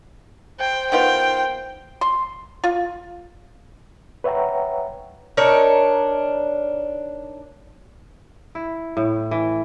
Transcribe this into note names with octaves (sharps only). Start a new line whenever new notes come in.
C5 G5
D#3 B3 F4 G5
C6
F4
B4 C#5 E5 F#5 G5 A#5
D4 D#4 A#4 C#5
E4
A2
E3